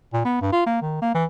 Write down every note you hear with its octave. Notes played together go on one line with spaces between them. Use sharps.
A#2
B3
G2
F4
A#3
D#3
A#3
E3